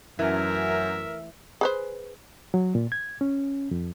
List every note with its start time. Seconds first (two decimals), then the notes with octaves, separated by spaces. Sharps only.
0.19 F#2 E3 A3 A#4 E5
1.61 G#4 B4 C5
2.54 F#3
2.75 A#2
2.92 G#6
3.21 C#4
3.71 F2